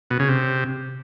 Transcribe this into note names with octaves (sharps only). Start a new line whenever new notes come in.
B2
C#3
C3